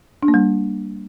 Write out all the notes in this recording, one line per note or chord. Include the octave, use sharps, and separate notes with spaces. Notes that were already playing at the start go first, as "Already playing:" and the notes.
D4
A#3
G3